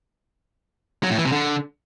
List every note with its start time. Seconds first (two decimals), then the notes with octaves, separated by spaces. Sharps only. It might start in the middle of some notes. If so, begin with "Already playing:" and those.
1.03 F#3
1.10 A2
1.18 E3
1.25 C3
1.32 D3